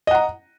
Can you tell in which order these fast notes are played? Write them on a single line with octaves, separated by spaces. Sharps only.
D#5 F#5 A#5